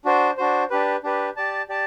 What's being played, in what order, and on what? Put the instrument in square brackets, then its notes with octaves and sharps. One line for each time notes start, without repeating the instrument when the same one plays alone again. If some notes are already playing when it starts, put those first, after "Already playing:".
[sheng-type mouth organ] D4 F#4 C5
D4 F#4 C5
D4 G4 B4
D4 G4 B4
G4 D5 A5
G4 D5 A5